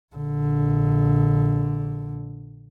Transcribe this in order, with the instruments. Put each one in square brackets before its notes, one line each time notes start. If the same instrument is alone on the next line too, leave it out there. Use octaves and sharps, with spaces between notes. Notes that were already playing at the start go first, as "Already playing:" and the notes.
[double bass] A#1 D3